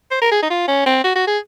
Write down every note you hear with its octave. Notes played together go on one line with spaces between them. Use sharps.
C5
A#4
G#4
D#4
F4
C#4
C4
F#4
F#4
G#4